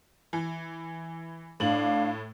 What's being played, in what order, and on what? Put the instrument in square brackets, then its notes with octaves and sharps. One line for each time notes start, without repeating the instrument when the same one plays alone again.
[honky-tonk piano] E3
[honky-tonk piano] A2 F#7 [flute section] D4 F5